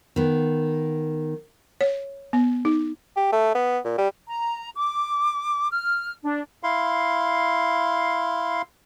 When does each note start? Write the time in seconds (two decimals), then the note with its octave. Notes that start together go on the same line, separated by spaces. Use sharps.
0.16 D#3 B3
1.81 C#5
2.33 B3
2.65 D#4
3.16 G4
3.32 A3
3.55 B3
3.84 A#2
3.98 G3
4.27 A#5
4.76 D6
5.71 F6
6.22 D4
6.63 E4 F5 C6